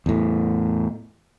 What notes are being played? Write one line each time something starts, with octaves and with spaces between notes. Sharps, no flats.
E2 A2